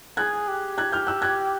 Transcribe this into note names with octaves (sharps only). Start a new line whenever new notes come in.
G#4 F#6 G#6
G4
F#6 G#6
F6 G6
E6 F#6
F#6 G#6